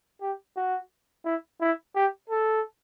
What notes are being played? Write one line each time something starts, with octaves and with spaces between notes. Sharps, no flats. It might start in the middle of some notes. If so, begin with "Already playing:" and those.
G4
F#4
E4
E4
G4
A4